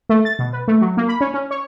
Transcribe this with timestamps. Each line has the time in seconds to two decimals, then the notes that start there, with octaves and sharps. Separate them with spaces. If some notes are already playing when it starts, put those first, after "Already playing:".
0.09 A3
0.25 A6
0.39 B2
0.53 B4
0.68 A3
0.81 F#3
0.97 A#3
1.08 B5
1.21 C#4
1.34 C#4
1.51 C#5